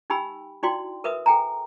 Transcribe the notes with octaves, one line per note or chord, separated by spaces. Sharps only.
D#4 G4 G5 G#5 B5 E6
D#4 E4 F#4 D5 G5 C6
A#4 B4 E5 D#6
A4 G5 G#5 A#5